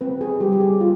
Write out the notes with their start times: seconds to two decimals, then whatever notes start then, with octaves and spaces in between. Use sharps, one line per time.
0.01 C4 B4
0.21 G#4
0.40 G3 G4
0.52 G4
0.60 G#4
0.73 G#4
0.80 F4